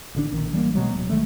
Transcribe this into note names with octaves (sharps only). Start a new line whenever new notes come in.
A1 D3 E3 D4
A#1 D#3
E3 G3 G#3 A#3
B2 D#3 F#3 G#3
D1
B1 D#3 G#3 A3